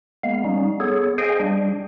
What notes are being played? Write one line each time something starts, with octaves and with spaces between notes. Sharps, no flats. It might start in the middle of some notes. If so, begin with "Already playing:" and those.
G#3 A#3 B3 F5
G3 C#4 D#4
B3 G#4 A4 C#5
G#4 C5 D#5 F5 G5 G#5
G3 D4